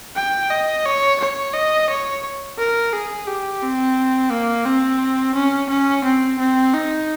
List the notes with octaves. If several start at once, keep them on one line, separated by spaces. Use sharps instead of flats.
G5
D#5
C#5
C#5
D#5
C#5
A#4
G#4
G4
C4
A#3
C4
C#4
C#4
C4
C4
D#4